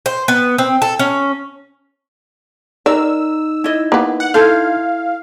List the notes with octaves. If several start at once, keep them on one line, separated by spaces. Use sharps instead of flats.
C5
B3
C4
A4
C#4
D#4 A#4 D5 E6
E4 D#5
A#3 B3
F#5
E4 A4 C5 F5